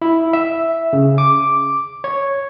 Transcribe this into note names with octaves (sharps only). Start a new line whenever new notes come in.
E4
E5
C#3
D6
C#5